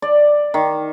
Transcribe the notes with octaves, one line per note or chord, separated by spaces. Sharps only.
D5
D#3